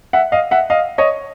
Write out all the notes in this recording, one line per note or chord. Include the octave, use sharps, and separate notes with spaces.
E5 F#5
D#5 F5
E5 F#5
D#5 F5
C#5 D#5